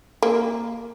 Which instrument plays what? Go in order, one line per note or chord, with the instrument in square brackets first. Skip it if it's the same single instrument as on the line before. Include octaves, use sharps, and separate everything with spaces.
[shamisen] A#3